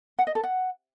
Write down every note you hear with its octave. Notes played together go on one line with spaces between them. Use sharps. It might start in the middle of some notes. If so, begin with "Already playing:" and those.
F#5
D#5
A4
F#5